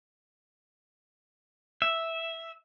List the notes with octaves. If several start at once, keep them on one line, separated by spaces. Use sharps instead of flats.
E5